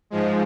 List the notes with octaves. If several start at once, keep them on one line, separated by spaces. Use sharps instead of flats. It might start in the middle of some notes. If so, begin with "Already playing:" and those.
G#2 F3 G#3